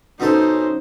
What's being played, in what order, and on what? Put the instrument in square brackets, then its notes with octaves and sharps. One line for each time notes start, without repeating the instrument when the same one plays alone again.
[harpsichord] B2 A4 C6 [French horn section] C#4 [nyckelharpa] D#4 C5